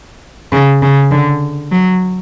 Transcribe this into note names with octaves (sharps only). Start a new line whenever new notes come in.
C#3
C#3
D3
F#3